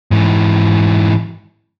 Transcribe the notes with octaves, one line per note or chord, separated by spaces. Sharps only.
G#2 E3